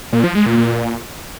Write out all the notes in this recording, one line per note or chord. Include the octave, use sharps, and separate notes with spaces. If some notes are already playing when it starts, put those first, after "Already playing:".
A#2
F3
G#3
A#2
A#2